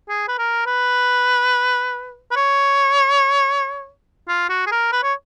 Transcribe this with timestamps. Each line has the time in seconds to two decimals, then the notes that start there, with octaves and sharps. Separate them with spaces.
0.09 G#4
0.28 B4
0.38 A#4
0.66 B4
2.31 B4
2.36 C#5
4.28 F4
4.49 F#4
4.67 G#4
4.72 A#4
4.92 B4
5.03 C#5